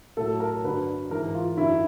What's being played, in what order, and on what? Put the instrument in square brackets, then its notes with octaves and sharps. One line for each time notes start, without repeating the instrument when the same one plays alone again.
[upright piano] A2 F#3 A4
A#4
G2 D3 F#3 B4
G#2 E3 A#4
F4
F#2 D3 F#3 E4